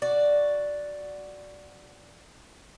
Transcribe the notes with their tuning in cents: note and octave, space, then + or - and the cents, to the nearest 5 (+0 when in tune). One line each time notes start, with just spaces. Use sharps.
F#4 +0 D5 +0